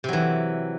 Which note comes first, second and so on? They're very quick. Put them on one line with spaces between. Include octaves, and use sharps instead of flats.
C3 F#3 E3